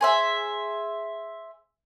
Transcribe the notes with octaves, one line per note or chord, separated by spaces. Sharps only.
G#4 C5 E5